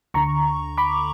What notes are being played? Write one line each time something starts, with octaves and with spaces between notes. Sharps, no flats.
D2 D3 A#5 C#6
B5 D6